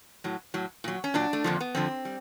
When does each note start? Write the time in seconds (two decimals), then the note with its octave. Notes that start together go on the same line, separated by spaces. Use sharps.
0.24 A2 F#3
0.54 A2 F#3
0.84 A#2 F#3
1.04 C#4
1.14 A#2 F#3 D4
1.33 A3
1.44 F2 D3 F3 A#3
1.61 B3
1.75 F2 D3 F3 C4
2.05 G3